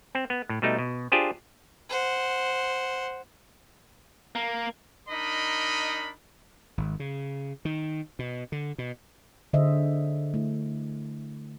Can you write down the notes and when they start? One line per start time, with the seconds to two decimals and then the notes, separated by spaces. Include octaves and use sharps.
0.15 C4
0.30 B3
0.49 A2
0.62 B2 G3 A3 D#4
0.78 B2
1.12 D4 F4 G4 G#4 C5
1.90 C5 F#5
4.35 A#3
5.09 D4 D#4 A#4 D#5 B5
6.78 G#1
7.00 C#3
7.65 D#3
8.19 B2
8.52 D3
8.78 B2
9.53 D3 G#4 C5 D#5 E5
10.34 A3 E4